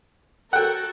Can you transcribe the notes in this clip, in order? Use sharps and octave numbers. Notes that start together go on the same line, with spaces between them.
F#4 A4 A#4 F#5 G5